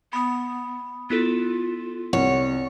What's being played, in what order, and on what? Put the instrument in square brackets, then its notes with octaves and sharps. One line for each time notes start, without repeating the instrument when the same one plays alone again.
[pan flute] B3 [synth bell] B5 D#6
[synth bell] B3 E4 A4 [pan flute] F4
[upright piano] C2 [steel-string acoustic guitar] C#5 [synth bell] F#5